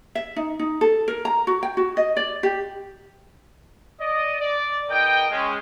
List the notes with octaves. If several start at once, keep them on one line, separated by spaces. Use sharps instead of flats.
E5
D#4
D#4
A4
A#4
A#5
F#4
G5
F#4
D#5
D5
G4
D5 D#5
D5
E2 B3 A#4 D#5 G5
G#3 C#4